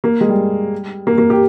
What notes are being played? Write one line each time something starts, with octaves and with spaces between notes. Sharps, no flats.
A#3
G#3
G3
A#3
A#3
G4